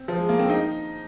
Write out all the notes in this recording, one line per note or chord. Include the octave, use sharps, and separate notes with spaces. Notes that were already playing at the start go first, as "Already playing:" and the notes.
Already playing: C4
F3
G#3
A#3
C4
D#4